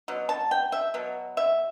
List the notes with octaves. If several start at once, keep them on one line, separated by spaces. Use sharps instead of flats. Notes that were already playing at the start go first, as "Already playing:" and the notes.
B2 F#3
A5
G5
E5
B2 F#3
E5